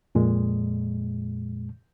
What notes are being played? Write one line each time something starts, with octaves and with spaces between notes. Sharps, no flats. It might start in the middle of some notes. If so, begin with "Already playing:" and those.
F2 A#2 G#3